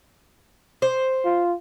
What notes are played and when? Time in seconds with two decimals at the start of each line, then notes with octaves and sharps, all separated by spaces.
0.82 C5
1.25 F4